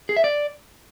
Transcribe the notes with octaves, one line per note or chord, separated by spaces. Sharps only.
G#4
E5
D5